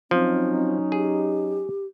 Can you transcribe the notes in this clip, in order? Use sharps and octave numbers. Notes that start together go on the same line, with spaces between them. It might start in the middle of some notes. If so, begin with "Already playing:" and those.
F3 F#3 C4 C#4 D#4
G4 G#4